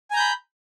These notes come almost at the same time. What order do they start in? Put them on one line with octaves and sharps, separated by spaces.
G#5 A#5 G6 B5